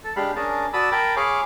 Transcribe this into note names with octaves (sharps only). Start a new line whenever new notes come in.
A4
G#3 D4 G4 F5 B5
C#4 D4 G#4 A#4 A5
F#4 D5 A5 B5 D#6 E6
A#4 G5 A5 B5
G#4 C#5 F5 G#5 B5 D6